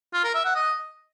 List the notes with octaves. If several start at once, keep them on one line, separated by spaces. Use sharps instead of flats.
F4
A#4
E5
F#5
D#5